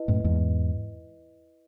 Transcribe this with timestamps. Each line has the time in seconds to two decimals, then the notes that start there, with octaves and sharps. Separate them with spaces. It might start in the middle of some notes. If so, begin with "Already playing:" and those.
Already playing: E4 B4 D#5
0.08 F#2 A2
0.24 E2 G#2